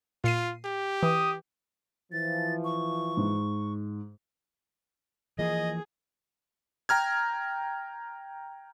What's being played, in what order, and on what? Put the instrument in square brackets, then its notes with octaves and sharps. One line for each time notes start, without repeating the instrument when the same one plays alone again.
[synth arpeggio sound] A#2 C7 D#7 [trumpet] F4
[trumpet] G4
[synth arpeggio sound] E3 [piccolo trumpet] D#6
[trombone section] E3 F3 [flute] A6
[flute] C#6
[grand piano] G#2
[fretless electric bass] E3 F3 A#3 [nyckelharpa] G#4 [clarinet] D#5
[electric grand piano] G5 A#5 F6 G#6